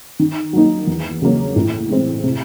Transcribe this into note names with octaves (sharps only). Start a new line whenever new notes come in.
D#3
F#3 A#3 D#4
E2
C#3 F#3 A#3 C#4
A2
E3 G#3 C4
C3